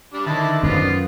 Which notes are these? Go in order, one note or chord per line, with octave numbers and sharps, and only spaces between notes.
G3 D4
D3 D#3 E4 A5 B5
F#2 B3 F4 C5